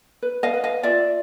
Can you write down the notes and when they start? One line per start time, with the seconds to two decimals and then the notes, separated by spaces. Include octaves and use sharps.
0.22 B4
0.43 D#5 F5
0.54 B4
0.64 D#5 F5
0.83 F4 D5 E5